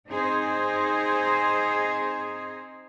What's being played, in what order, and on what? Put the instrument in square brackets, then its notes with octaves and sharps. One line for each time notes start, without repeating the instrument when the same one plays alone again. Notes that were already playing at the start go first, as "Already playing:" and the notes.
[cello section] C4 D#4 G#4 C5